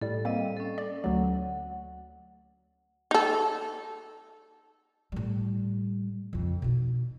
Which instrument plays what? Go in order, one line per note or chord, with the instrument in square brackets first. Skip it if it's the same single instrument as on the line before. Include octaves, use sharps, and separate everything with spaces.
[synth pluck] A2 G3 [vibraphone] A4
[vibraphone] G3 D#5 [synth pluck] A#3 C4
[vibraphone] C#4 A4
[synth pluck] D5
[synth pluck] D2 F#3 [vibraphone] F#5
[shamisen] D#4 A4
[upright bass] A2 G3
F2 C#3
B2 D#4